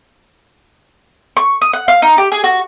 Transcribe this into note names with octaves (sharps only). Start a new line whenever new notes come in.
C#6
D#6
F#5
F5
D#4
G4
G#4
F#4